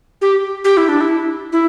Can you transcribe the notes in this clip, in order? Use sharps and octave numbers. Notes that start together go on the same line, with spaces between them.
G4
G4
E4
D4
E4
E4